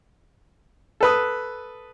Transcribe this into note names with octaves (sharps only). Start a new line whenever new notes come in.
A4 B4 D#6